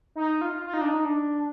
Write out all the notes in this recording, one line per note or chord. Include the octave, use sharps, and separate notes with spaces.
D#4
F4
F4
D#4
D4
D#4
D4